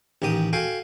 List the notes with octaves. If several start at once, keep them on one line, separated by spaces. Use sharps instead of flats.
A1 D#3 G4 D#6
F#4 A4 F5 G5 G#5